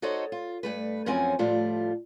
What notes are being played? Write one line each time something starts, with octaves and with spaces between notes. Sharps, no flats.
D#4 F#4 A4 C5 C#5 D#5
F4
G2 A3 B4
F#2 F3 F#3 C4 C#4 G#5
A2 F3 G3 A3 F4